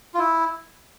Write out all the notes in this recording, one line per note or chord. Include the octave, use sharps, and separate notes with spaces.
F4
E4